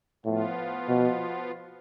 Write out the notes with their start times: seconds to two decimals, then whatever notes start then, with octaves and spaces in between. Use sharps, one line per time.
0.25 A2 F3 B3 F4
0.89 B2